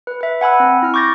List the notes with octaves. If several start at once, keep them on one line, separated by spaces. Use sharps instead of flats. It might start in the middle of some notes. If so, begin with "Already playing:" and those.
B4
B4 E5
F#5 G#5 B5 E6
C4
E4 F6
C#6 D6 G6 A6 A#6